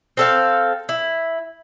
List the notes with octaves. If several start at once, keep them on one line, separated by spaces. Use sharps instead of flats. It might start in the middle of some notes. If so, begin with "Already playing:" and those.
C4 A4 F5
E4